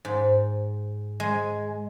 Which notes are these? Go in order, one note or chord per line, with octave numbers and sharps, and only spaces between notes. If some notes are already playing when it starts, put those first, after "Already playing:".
G#2
G#3